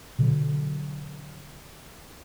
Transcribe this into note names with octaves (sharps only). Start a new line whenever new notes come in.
B2 D3 F#3